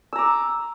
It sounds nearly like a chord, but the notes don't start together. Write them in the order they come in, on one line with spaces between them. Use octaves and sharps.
E6 A#5 D6